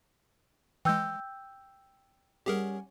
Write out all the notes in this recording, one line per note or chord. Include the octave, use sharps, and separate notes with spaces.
E3 G#3 G5 E6 G6
G3 C#4 G4 G#4 A#4 F#5